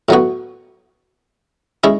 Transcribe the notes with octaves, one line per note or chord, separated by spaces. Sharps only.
A2 F#3 B3 F#4
G#3 C#4 E4